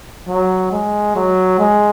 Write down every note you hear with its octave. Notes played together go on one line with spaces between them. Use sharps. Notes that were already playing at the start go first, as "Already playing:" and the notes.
F#3
G#3
F#3
G#3